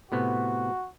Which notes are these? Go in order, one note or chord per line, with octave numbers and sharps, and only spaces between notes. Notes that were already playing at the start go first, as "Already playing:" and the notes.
A2 C3 B3 F#4